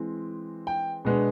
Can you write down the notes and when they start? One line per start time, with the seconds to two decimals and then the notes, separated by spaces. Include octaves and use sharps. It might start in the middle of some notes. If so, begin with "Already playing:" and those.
Already playing: E3 G#3 C4
0.67 G5
1.05 B2 G#3 B3 D4